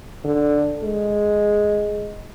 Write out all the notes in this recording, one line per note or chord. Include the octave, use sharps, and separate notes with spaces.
D3
G#3